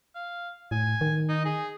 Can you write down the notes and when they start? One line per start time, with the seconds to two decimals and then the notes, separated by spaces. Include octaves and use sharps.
0.15 F5
0.71 A2 G#5
1.01 D#3
1.29 D#4
1.45 G#4